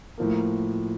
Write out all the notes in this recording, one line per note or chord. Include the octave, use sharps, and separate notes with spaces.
A2 F3 A#3